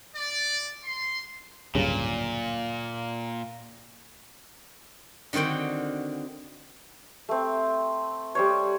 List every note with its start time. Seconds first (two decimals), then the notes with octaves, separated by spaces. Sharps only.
0.16 D5
0.85 C6
1.75 D1 G2 A#2 C#3
5.33 D3 D#3 C4 F#4 G5
7.29 A3 C4
8.35 G3 C5 C#5